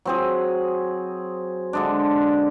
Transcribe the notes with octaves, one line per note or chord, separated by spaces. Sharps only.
F#3 C4 G#4
D3 G#3 D4